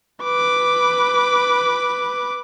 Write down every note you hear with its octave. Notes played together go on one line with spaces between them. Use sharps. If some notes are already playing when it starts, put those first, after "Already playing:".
B4 D6